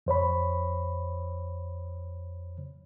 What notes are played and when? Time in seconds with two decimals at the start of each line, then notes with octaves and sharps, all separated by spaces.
0.06 F2 C5 C#5 B5